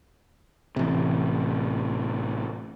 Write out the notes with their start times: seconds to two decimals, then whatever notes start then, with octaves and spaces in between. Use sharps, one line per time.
0.76 A1 C3